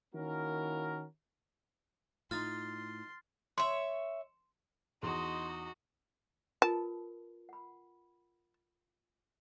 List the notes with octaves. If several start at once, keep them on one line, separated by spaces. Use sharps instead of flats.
D#3 A#3 C#4 E4 F#4 A#4
A2 D#4 F4 C6 F6 A6
C#5 E5 C6
E2 D#4 F#4 D#5 C6
F4 A#4 B4 A5
F#5 B5